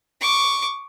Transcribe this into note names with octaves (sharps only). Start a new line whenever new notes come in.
C#6 D6